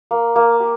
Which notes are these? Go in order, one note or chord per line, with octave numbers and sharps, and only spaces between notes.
A#3
A#3
G4